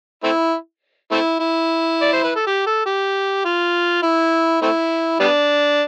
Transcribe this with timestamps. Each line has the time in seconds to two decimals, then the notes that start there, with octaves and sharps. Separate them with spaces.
0.24 A3 C4 E4
1.11 A3 C4 E4
1.40 E4
2.02 D5
2.13 C5
2.24 B4
2.36 A4
2.46 G4
2.67 A4
2.86 G4
3.45 F4
4.03 E4
4.62 A3 C4 E4
5.20 G3 B3 D4